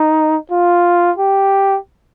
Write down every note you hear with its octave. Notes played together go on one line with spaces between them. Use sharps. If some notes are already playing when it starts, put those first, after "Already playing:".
Already playing: D#4
F4
G4